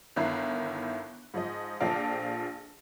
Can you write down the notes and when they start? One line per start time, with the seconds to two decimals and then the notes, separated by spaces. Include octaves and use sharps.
0.16 G1 D#3 E4 A#5 F#6 C7
1.34 G#2 F3 D#5
1.80 A#1 F3 D4 A4 F5 G5